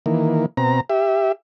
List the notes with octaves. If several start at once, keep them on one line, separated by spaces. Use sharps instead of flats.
D#3 E3 A#3
B2 C4 A#5
G4 E5